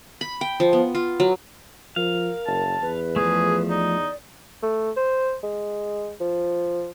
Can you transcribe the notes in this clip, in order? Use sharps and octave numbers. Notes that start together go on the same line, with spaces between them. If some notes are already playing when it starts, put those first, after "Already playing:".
B5
G5
F3
B3
F4
F#3
F3 A#4 F5
F#1 A5
E2 B4
F3 A3 G#4
D#4 D5
A3
C5
G#3
F3